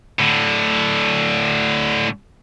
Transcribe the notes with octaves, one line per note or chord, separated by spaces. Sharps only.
A2 D3